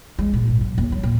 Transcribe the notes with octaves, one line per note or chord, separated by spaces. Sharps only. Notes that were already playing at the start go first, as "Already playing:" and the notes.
G#3
A#2
G#1
F#3
D#2
F#3
A#2